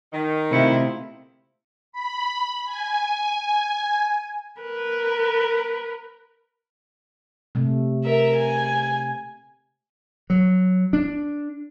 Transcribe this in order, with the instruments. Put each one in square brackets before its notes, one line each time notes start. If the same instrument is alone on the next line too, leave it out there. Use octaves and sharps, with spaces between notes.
[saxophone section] D#3
[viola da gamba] C3 E4 F4 [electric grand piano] A3 C4 C#7
[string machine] B5
G#5
[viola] A#4 B4
[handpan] C3 A3
[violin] A#4 E5
G#5
[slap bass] F#3
D4